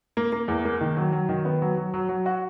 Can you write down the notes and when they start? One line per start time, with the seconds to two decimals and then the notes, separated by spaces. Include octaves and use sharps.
0.17 A#3
0.32 A#3
0.48 E2
0.65 A#3
0.81 D#3
0.97 F#3
1.13 F#3
1.29 D#3
1.45 B3
1.62 F#3
1.77 F#3
1.94 F#3
2.09 F#3
2.26 F#4